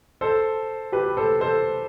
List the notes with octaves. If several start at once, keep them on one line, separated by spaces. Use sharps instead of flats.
A4 C5
G4 B4
A4 C5
A4 C5